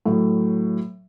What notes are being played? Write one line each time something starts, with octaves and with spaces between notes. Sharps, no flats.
A2 F#3